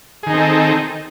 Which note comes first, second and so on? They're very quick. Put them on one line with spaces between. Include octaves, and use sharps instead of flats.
G#4 D#3 D#4 C4 A4